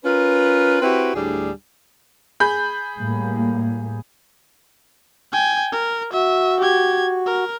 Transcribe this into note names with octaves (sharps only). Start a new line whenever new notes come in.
C#4 F4 A#4 B4
C4 E4 F#4 G4 B4
D2 A2 G3 D4 G#4
G#4 B5 G6
A2 G3 A#3
G5 G#5
A#4
F#4 E5
G4 G#6
A#4